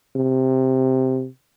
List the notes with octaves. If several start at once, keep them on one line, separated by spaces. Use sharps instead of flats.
C3